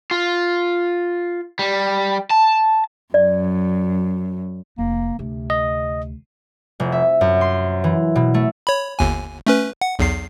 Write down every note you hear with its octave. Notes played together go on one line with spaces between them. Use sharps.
F4
G3
A5
F#2 D5
F1 A#3 D#4
D2 C3
D#5
F1
E5
F#2
C6
E3
B2
A3
C#5 B5
G1 D#2 G#5
A3 C#4 B4
F#5
B1 E2 C7